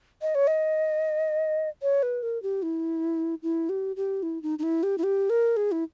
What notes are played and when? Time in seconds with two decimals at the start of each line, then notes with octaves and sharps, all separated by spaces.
0.22 D#5
0.35 C#5
0.47 D#5
1.82 C#5
2.03 B4
2.23 A#4
2.42 G4
2.62 E4
3.43 E4
3.69 G4
3.96 G4
4.23 E4
4.43 D#4
4.59 D#4
4.63 E4
4.83 G4
4.98 E4
5.03 G4
5.30 A#4
5.57 G#4
5.72 E4